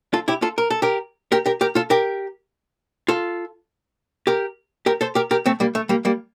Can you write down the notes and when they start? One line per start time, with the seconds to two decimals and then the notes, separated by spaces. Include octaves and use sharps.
0.13 F4 A4
0.28 E4 G4
0.42 F4 A4
0.58 A#4
0.70 A4
0.82 G4 A#4
1.32 G4 A#4
1.46 G4 A#4
1.61 G4 A#4
1.75 F4 A4
1.90 G4 A#4
3.08 F4 A4
4.27 G4 A#4
4.86 G4 A#4
5.01 A4 C5
5.15 G4 A#4
5.31 G4 A#4
5.46 A3 C4
5.60 G3 A#3
5.75 A3
5.89 G3 A#3
6.05 G3 A#3